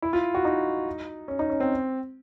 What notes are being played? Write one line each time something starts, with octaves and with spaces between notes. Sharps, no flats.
E4
F4
F#4
D#4
C#4
D#4
C#4
C4